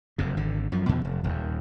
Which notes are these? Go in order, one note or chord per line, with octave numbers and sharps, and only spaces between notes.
F#1 F2 C3
G#1 D3
F#2 F3
E2 B2 D3 F3
F1
D#1 D#2